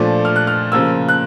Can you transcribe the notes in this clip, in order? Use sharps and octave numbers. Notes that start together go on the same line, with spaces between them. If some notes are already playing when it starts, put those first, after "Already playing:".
Already playing: A#2 F3 A3 D4
F6
F#6
F6
C#3 F3 A#3 E6
F#6